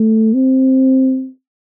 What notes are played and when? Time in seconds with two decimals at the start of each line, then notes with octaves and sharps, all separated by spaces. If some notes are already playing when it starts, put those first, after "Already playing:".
Already playing: A3
0.34 C4